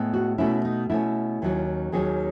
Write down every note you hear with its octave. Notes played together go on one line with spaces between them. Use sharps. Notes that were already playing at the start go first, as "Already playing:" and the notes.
Already playing: A2 G#3 B3
F#4
B2 A3 C#4 E4
D#4
B2 A3 C#4 E4
D#2 D#3 F#3 C#4
D#2 D#3 F#3 C#4 G#4